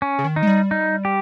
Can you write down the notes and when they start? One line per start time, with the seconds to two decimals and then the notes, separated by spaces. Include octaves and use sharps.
0.02 C#4
0.19 C#3
0.24 D#3
0.36 D#4
0.43 G#3
0.47 G3
0.71 D#4
1.05 G4